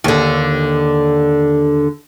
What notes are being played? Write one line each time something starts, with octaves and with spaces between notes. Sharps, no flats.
D#2 D3